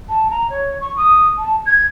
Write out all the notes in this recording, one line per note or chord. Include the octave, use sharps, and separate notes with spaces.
A5
A#5
C#5
C#6
D#6
A5
G#6